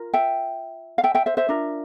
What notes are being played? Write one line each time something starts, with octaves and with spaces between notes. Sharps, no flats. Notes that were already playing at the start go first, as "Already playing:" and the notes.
Already playing: F4 A#4
E5 G5
F5
E5 G5
E5 G5
C5 E5
C5 E5
D4 F4 A#4